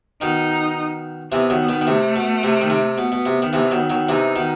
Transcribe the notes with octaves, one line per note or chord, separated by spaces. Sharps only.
B2 D#3 D#4
C3 E3 B3
D#3 F#3
B2 D#3
D#3
C3 A3
B2
C3
D#3
C3
B2 B3
B2
C3
D#3
C3 E3
D#3 F#3
D#3 F#3
C3 E3 D#4
B2 D#3